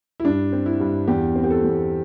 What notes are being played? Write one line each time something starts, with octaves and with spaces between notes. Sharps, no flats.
E4
G2 D4
C4
E4
G2
E2 G4
C4
G4
A4
E2